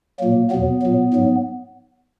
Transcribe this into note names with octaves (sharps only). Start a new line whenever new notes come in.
A#2 F#3 A#3
E2 B2 F#3 B3
A#2 F#3
G#2 F#3